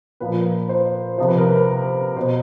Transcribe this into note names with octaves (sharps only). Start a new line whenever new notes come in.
A#2 F3 B4
C5
C3 F3 C5
B4
A#4
B4
B2 C5